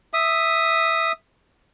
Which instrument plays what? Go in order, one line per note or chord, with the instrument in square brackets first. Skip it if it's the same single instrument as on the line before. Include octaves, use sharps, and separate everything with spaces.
[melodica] E5 D#6